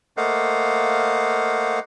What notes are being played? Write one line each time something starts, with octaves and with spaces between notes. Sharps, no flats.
A3 A#3 C5 D#5 F5 F#5